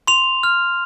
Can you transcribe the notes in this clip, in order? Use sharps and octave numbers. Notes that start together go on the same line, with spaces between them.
C6 F7
F6